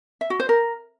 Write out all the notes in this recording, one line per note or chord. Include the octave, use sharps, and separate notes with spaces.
E5
F#4
C5
A#4